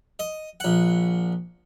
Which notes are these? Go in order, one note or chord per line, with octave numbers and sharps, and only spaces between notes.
D#5
A#1 F#5